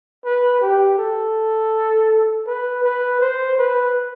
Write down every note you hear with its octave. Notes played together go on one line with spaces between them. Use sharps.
B4
G4
A4
B4
B4
C5
B4